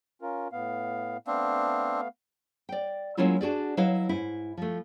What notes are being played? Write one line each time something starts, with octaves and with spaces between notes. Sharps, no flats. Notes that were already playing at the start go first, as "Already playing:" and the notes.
C#4 F4 A#4
A2 B3 F5
A3 B3 C4 D4 F5
D5 G5
F#3 G#3 A#3 C#4 E4 F4
D4 F#4 G#4 D5
F#3 E4 B4 D#5 F5
G#2 E4
F3 A3